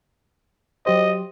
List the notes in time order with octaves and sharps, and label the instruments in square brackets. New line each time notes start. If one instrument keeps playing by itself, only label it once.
[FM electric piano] F#3 G4 C5 [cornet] D#5